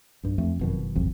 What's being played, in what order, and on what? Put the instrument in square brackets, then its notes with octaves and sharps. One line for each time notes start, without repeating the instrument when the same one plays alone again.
[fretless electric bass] B1 G2
[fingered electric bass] F2 [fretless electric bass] A3
[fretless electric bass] F#1 B2 D#3
[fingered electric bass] D1 G#1 F2